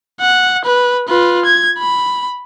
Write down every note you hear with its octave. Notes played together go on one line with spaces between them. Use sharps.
F#5
B4
F4 B4
G#6
B5